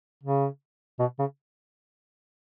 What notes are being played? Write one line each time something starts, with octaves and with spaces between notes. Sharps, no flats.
C#3
B2
C#3